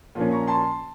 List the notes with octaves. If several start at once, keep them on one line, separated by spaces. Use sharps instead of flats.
A#2 F3 A#3 C#4
A#5 C#6
A5 C6